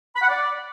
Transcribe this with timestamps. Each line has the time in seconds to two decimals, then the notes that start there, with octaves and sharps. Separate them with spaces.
0.15 B5
0.21 F#5
0.28 D5